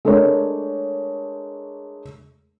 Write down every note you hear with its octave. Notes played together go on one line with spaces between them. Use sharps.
G#3 A3 D4 A#4 C#5